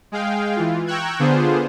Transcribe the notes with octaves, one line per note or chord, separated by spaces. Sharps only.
G#3 G#4 F5 G5
E3 F4
G5 A#5 C#6 E6 F#6 G#6
D3 B3 D4 F4 G#4 C5